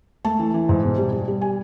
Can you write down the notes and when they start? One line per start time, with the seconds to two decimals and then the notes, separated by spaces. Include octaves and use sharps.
0.25 A3 A5
0.39 E3
0.54 E3
0.69 G#2
0.83 B2
0.98 G3
1.12 G3
1.28 G3
1.41 G#5